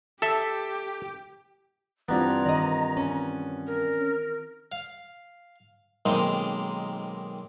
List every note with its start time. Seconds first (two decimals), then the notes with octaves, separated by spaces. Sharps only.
0.22 G4 A4 E5
2.09 G2 E3 B3 C4 F4 A#5
2.46 D#3 D5 D#5
2.97 C#4
3.67 A#4
4.72 F5
6.06 B1 D#3 G#3 A#3 C4